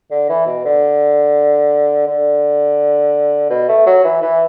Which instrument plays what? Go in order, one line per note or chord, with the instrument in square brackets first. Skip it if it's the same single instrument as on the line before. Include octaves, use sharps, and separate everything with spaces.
[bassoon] D3
E3
B2
D3
D3
B2
A3
F#3
E3
E3